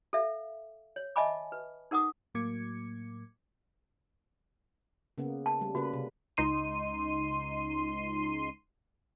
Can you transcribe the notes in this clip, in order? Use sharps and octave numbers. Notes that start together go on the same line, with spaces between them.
A4 E5 F5
C#5
D#5 E5 G#5 A5 B5 D6
B4
D#4 A#4 F#5 D6 D#6
A2 F#3 A#3 D6 G#6 C#7
C#3 A#3 B3
A5
G3 A3
C#3 A#3 F#4 B4
C3
C#2 D#4 C6 D#7